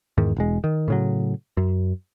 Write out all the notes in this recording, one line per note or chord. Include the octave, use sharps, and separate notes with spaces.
E2 G#2 D#3
E1 G#3
D#3
A2 C#3 F#3
F#2